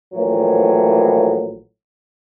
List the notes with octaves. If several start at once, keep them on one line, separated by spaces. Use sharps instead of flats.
A#1 A2 E3 F#3